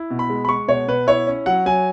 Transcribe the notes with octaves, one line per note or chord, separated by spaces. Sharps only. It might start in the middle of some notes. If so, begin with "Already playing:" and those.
Already playing: E4
B2
B5
G#3
B5
G#3 C#6
B2 C#5
B2 B4
E4 C#5
C#4
F#3 F#5
F#3 G#5